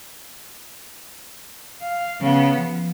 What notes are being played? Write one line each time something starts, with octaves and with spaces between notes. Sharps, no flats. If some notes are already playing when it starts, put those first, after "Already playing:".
F5
C#3 B3
F3